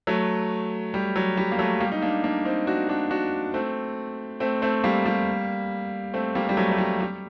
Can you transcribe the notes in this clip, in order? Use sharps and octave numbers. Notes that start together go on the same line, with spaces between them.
F#3 A3
G3
F#3
G3
A#3
F#3 A3
G3 A#3
D#4
A#3 D4
A#3 D4
C4 D#4
D4 F#4
D4 F#4
D4 F#4
A3 C4
A3 C4
A3 C4
G3 A#3
G3 A#3
A3 C4
G3 A#3
G3
F#3 A3
A3
G3
G3